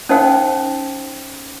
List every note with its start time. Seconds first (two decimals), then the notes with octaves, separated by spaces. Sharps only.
0.09 C#4 D#4 C5 F5 G5